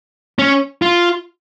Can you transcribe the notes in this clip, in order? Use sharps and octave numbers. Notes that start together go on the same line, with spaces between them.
C#4
F4